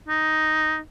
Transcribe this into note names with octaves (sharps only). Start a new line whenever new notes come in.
D#4